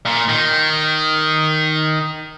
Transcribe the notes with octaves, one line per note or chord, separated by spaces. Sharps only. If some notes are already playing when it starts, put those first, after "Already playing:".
A#2
D#3